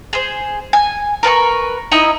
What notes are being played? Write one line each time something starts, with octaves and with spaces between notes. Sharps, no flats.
G#4 C5
G#5
A#4 B4 A5 C#6
D#4 E4 D#5 E5